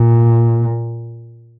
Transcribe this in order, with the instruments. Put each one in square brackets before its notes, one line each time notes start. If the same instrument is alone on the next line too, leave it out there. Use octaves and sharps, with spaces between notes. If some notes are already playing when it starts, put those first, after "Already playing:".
Already playing: [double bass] A#2